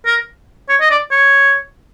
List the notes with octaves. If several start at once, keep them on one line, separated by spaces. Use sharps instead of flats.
A#4
C#5
D#5
D5
C#5